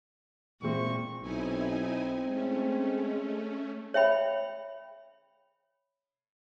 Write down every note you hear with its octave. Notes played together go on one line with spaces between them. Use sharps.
A#2 E3 G#3 C4 C#6
B1 C4 D#4 E4 G#5
G#3 A3 C#4
C#5 E5 G5 B5